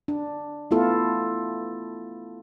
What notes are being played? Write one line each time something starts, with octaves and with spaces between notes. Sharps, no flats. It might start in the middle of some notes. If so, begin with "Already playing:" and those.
D4
A3 B3 E4 F4 A4